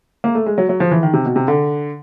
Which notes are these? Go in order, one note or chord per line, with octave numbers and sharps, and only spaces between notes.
A#3
A3
G#3
F#3
F#3
F3
E3
D#3
C3
B2
C3
D3